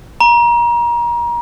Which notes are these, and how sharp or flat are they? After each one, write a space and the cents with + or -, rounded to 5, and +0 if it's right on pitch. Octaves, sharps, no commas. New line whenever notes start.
A#5 +30